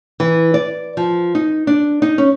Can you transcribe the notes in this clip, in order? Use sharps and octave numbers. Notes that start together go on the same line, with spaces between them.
E3
D5
F3
D#4
D4
D#4
C#4